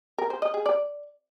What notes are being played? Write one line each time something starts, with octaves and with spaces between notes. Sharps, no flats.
A#4
C5
D#5
G#4
D5